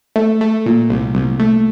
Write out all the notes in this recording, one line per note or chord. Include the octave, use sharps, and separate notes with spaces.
A3
A3
A#2
C2
C2
A3